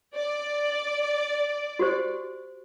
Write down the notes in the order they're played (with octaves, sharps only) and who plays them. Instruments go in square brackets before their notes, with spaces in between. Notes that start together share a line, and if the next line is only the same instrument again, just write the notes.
[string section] D5
[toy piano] F#4 G4 C5